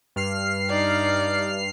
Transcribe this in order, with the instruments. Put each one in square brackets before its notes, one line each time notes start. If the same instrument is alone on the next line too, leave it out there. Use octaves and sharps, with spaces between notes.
[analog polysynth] G2 F6 C7
[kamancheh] D#4 D5